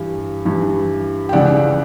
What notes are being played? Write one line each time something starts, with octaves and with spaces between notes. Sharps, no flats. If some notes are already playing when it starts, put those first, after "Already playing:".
Already playing: G2 E3
G2 E3
G5
C#2 C#3 E3 D5 F#5